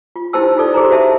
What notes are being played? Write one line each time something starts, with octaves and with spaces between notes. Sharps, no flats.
F4
D#4 E4 G4 C5 A5 E6
D#4 F4 A4 D5
G4 G#4 C5 A#5
F#4 C5 D#5 E5 A5